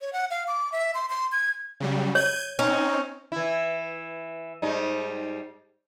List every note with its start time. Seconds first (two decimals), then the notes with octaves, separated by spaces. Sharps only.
0.01 C#5
0.13 F#5
0.30 F5
0.47 D6
0.72 E5
0.95 C6
1.09 C6
1.32 G#6
1.80 C#3 F#3 G3
2.15 C#5 G6 G#6 D#7
2.59 C4 C#4 D#4
3.32 E3 E4
4.62 G#2 G3 D#4